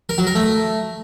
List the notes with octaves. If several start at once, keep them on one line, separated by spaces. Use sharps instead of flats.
A#4
F#3
A#4
A3